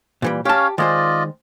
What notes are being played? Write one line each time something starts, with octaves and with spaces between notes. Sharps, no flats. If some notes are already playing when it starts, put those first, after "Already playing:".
A#2 E3 G3
C#4 G4 C#5 F5 A5
D#3 G#3 F4 C5 D5 D#5